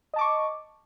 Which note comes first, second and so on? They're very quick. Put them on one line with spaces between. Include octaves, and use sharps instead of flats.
D#5 A5 D6 C#6